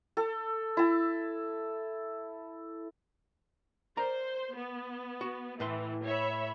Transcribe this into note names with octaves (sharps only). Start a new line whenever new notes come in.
A4
E4 A5
A#4 C5 D5 A#5
B3
F#4
A2 E3 B4 C6
C#5 E5 B5